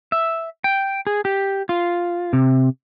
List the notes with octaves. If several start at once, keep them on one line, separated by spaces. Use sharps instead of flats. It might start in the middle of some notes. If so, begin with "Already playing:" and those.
E5
G5
G#4
G4
F4
C3